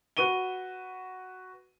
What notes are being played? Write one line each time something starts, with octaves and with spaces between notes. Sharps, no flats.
F#4 B4 C#6 D#7 G7